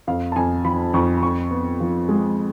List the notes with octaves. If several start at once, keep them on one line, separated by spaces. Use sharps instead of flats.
F2 F5
A5
F2 G#5
F3 B5
F2 C#6
F2 C#6
B3
F3
G#3